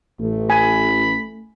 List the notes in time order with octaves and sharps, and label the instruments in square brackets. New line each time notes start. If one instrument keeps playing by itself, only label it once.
[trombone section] A1 [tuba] A3
[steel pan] G#5 [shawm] B5